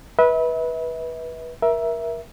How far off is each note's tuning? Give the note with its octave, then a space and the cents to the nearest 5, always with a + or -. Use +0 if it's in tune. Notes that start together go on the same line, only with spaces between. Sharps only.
B4 -15 E5 -40
A#4 +25 E5 +0